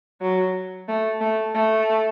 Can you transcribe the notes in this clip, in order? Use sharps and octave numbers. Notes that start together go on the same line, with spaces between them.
F#3
A3
A3
A3